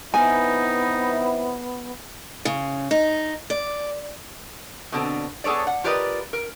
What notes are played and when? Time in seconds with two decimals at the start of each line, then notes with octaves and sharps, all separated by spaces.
0.14 E3 B3 C4 D#4 E4 G#5
2.45 C#3
2.91 D#4
3.50 D5
4.92 B2 D3 C4
5.44 B3 G#4 A4 C#5 D5
5.67 F#5
5.84 F4 G4 A#4 B4 D5 D#5
6.33 A#4